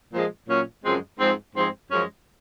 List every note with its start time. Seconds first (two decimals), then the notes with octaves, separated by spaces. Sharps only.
0.12 A#2 F3 G#3
0.48 A#2 F#3 C#4
0.83 F#2 C#3 F3 G#3 C4
1.19 G#2 F3 G#3 C4
1.54 G#2 F3 G#3 C4
1.90 F#2 F3 G#3 C#4